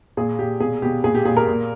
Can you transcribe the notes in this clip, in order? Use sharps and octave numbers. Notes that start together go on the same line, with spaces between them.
A#2 G#4
A#2 G4
B2 G#4
B2 G4
A#2 G#4
G4
A#2 G#4
A#4
A#2